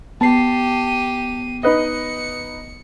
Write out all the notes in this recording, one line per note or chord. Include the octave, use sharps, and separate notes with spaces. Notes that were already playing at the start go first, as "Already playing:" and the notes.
B3 G4 A5 C7 D#7
D#4 B4 D#5 C#7